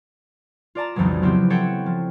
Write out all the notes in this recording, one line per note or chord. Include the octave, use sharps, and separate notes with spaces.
F4 D5 A5 A#5
B1 F2 C#3 E3 F#3 G#3
C#3 F3 B3 C4 E4 G4
C4 A4 C#5 E5 F#5 G5
F3